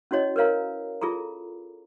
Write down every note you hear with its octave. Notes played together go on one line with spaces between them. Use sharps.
C#4 E4 F#4 C#5 D#5
A#4 B4 C#5 F5 A#5
F4 G#4 A4 A#5